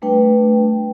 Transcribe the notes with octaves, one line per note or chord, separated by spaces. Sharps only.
G3 A3 D4 B4 G5